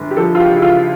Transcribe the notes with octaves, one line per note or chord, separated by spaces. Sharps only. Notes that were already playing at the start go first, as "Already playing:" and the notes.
Already playing: G1
G4
F3 A4
F4
G4
C#3 E4
F4